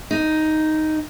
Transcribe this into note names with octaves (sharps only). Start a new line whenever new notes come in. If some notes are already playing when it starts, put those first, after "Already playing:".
D#4